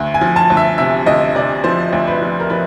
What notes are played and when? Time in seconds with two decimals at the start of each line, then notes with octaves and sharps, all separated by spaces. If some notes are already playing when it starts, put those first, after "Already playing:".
Already playing: D2
0.14 G#5
0.21 F3
0.36 A5
0.50 D2
0.57 E5
0.78 C3 E5
1.06 D2 D#5
1.35 C3 D5
1.64 F3 C5
1.93 D2
2.07 B4
2.22 F3
2.40 A#4
2.50 F3 B4